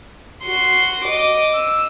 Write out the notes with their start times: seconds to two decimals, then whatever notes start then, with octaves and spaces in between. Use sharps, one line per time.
0.43 F#4 C6
1.05 D#5 D6
1.54 E6